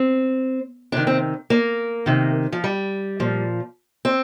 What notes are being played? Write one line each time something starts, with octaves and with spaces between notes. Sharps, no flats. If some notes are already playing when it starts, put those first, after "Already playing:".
Already playing: C4
C3 D#3 D4
C4
A#3
C3 D#3
F3
G3
A#2 F3
C4